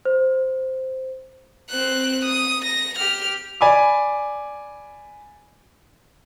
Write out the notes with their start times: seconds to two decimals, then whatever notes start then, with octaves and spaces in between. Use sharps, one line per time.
0.05 C5
1.70 C4 F#6
2.25 D#6
2.65 A#6
2.99 G4 F6
3.61 D5 G#5 B5 D6